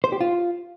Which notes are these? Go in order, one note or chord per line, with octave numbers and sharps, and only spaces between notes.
C5
G4
F4